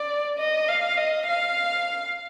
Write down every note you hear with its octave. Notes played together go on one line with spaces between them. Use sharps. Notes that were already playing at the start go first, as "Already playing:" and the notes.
Already playing: D5
D#5
F5
D#5
F5